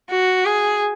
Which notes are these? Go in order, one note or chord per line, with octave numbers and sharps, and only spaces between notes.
F#4
G#4